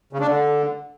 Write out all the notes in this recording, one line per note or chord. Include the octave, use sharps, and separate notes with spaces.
C#3
D4
D3